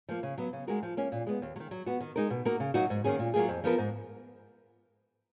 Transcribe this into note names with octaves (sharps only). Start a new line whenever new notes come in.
F3 A#3
C#3
F#3 B3
C#3
G#3 D#4 F#4 A#4
F3
A#3 C#4
A#2
G#3 B3
D#2
F#3
D#3
F#3
B3 F#4
D#3
G#3 D#4 A#4
B2
A#3 D#4 F#4 A#4
C#3
F#3 A#3 D#4 F#4
G#2
D#3 A#3 C#4 G#4
A#2
F#3 A#3 F4 G#4
F2
F3 B3 F4 A#4
G#2